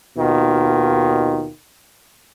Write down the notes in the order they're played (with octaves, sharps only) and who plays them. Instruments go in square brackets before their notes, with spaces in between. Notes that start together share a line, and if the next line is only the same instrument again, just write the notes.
[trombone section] D#2 B2 D#3 F4